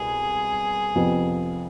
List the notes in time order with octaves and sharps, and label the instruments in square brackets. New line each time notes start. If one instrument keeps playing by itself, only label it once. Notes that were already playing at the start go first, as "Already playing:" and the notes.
Already playing: [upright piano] C2 B2 B3 [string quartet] G#4
[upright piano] F2 C3 F3 B3